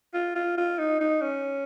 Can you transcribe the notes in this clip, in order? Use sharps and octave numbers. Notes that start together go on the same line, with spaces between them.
F4
F4
F4
D#4
D#4
C#4